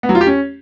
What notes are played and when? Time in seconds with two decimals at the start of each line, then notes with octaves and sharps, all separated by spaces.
0.03 B3
0.09 F#3
0.15 F4
0.21 G4
0.27 C#4